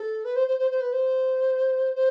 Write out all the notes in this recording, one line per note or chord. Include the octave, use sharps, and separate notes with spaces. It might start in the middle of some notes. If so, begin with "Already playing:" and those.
Already playing: A4
B4
C5
C5
C5
C5
B4
C5
C5